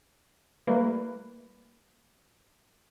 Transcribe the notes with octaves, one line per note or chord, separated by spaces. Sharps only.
G3 A3 A#3 B4